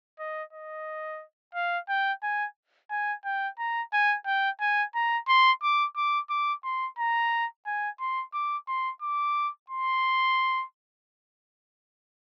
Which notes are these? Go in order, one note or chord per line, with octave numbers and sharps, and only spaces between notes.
D#5
D#5
F5
G5
G#5
G#5
G5
A#5
G#5
G5
G#5
A#5
C6
D6
D6
D6
C6
A#5
G#5
C6
D6
C6
D6
C6